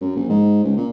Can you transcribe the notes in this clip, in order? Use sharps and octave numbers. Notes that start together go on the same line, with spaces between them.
F#2
A#1
G#2
C#2
A#2